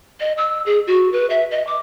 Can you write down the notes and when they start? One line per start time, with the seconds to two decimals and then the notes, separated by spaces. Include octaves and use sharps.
0.20 D#5
0.37 E6
0.66 G#4
0.87 F#4
1.12 B4
1.30 E5
1.51 D#5
1.67 D6